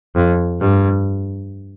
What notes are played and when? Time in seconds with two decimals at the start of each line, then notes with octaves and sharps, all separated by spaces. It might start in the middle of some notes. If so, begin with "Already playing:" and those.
0.16 F2
0.60 G2